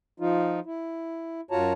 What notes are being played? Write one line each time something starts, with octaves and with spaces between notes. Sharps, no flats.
F3 D#4 F4
E4
F#2 F4 F#4 C#5 A5 A#5